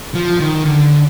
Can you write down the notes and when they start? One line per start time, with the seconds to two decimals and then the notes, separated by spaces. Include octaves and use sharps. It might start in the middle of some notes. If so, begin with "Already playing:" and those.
0.15 F3
0.40 D#3
0.65 D3